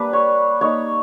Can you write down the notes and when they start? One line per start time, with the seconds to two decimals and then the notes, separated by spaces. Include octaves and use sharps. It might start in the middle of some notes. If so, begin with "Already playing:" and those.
Already playing: G3 A#3 D4 B4
0.13 C#5
0.61 A#3 D#4 C#5